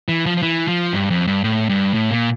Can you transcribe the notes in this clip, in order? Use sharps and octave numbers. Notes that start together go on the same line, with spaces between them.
E3
F3
F3
E3
F3
G2
F2
G2
A2
G2
A2
A#2